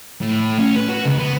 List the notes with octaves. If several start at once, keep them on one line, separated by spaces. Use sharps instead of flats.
A2
C#4
B4
F#4
C#2
B3